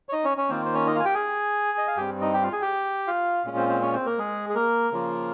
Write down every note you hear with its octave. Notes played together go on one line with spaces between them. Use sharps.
C#5
D#4 D#5
C#4 C#5
C#4 C#5
D#3 A#3 C4 F4 C5
C5
C#4 C#5
D#4 D#5
F4 F5 G#5
G4 G5
G#4 G#5
D#5
F5
G2 G3 C4 G4 G5
D#4 D#5
G4 G5
F4 F5
G#4 G#5
G4 G5
F4 F5
A#2 G#3 C#4 F4
C4 C5
C4 C5
C#4 C#5
C4 C5
A#3 A#4
G#3 G#4
G#4
A#3 A#4
C#3 F3 A#3 F4